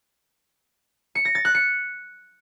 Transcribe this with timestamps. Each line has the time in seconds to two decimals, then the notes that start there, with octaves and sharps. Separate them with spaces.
1.15 C#7
1.25 A#6
1.35 A6
1.45 F#6
1.55 C#7